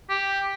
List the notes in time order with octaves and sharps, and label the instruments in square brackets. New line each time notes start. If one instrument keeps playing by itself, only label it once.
[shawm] G4